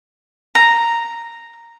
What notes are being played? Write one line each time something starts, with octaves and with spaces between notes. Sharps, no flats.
A#5